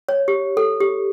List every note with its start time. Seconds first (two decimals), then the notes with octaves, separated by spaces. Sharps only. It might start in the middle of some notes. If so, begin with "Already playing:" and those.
0.09 C#5
0.28 G4
0.57 A4
0.80 G4